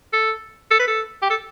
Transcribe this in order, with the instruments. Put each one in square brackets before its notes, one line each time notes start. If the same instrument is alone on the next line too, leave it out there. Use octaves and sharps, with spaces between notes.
[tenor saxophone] A4
A4
B4
A4
G4
A4